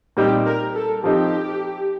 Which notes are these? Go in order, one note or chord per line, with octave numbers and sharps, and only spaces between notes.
A#2 G3 C4 D#4 G4
A#4
A4
F3 C4 D#4 G4